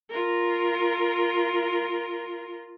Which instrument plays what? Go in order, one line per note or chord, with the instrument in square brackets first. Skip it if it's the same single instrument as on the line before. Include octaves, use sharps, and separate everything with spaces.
[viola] F4 A#4